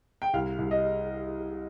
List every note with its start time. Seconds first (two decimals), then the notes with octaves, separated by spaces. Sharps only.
0.22 G5
0.33 C2 F5
0.59 C2
0.71 D#5